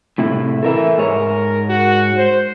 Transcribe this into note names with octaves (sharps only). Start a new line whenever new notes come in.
A2 C3 E4
E3 A4 A#4 E5
G#2 G#4 A#4 C#5
F#4
C5